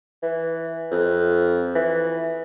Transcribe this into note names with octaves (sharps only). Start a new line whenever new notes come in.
E3
F2
E3